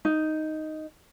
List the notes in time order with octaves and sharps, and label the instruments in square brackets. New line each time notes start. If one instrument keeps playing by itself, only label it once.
[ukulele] D#4